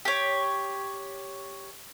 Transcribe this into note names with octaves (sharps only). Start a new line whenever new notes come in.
G4 C#5